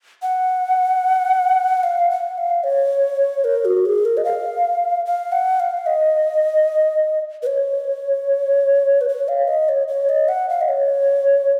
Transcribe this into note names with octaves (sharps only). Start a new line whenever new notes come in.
F#5
F5
F#5
F5
C#5
A#4
F#4
G#4
A#4
D#5
F5
F5
F#5
F5
D#5
B4
C#5
B4
C#5
F5
D#5
C#5
C#5
D#5
F#5
F5
D#5
C#5